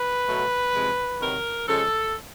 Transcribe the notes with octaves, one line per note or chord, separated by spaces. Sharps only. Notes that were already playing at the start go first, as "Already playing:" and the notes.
Already playing: B4
B2 F#3 A3
C3 F3 G#3
C3 D#3 F#3 A#4
C#3 F3 G#3 A4